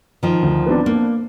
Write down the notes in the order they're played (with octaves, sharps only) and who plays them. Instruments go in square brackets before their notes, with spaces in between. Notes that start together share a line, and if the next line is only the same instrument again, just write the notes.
[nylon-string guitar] D#3 F3
[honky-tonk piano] D2
B3 C4 D4
[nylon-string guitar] A#3